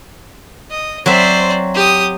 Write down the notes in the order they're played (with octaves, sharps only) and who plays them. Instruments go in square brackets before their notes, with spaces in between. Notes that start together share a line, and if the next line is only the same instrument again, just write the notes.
[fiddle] D#5
[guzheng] F#3 C4 E5 [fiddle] C5 D5
[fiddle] G4 D#6